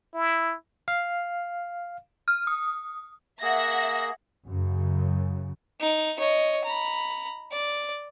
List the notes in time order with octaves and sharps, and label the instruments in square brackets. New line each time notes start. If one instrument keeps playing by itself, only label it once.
[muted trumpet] E4
[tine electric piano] F5
[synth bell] F6
D#6
[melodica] A#3 G#4 [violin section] E5 F#5 A#6
[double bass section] F#2 C#3
[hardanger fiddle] D#4
C#5 D#5
A#5 B5
D5